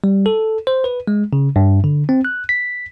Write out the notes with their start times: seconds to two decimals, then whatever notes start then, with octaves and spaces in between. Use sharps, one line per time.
0.04 G3
0.26 A4
0.67 C5
0.84 B4
1.08 G#3
1.33 C#3
1.56 G2
1.84 D3
2.09 C4
2.25 F#6
2.49 B6